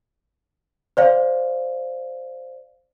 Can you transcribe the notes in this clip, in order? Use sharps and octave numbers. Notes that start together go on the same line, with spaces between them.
C5 D5 F5